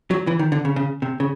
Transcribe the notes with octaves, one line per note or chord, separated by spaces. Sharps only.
F#3
E3
D#3
D3
C#3
C#3
C3
C#3